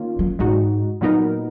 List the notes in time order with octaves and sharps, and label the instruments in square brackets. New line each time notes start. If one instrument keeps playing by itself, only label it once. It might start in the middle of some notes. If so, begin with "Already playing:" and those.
Already playing: [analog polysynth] D#3 A#3 C#4 F4
[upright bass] F#3
[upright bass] G#2 [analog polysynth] G#3 D#4 F#4
[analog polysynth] A#2 F#3 B3 D#4 A#4